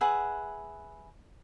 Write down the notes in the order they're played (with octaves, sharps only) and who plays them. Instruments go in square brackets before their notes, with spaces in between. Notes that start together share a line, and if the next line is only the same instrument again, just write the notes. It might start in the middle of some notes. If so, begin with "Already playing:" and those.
[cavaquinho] G#4 B4 E5 F#5